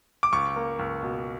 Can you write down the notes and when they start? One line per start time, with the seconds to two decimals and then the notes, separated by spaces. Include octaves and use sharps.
0.23 D6
0.33 C#2 C#6
0.56 A#3
0.79 C#2
1.03 B2